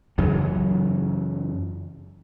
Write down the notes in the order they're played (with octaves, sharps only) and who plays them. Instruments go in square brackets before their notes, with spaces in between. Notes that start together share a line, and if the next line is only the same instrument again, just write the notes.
[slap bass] F#2 C#3 E3 F#3